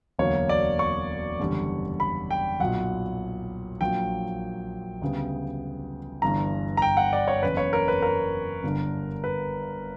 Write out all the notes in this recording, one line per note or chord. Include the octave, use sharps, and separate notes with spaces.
E1 D2 D3 F#3 A#3 C#5
D5
C#6
F#1 E2 D3 G3
B5
G5
B1 A#2 F#3 F#5
A#1 A#2 F#3 A#3 G5
D2 C#3 G3 B3
G1 G2 E3 A#5
A#5
G5
F#5
D5
C#5
F#1 E2 C#3 B4
C#5
A#4
B4
A#4
G1 G2 D3
B4